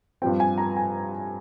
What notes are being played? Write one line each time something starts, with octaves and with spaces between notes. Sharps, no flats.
G2 F3 C4 G5
G#5
A#5
G#5